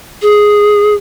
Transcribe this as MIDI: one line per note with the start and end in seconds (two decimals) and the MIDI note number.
0.22 0.94 68